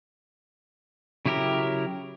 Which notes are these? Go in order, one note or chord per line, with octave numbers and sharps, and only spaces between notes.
C#3 F#3 E4 G4 A#4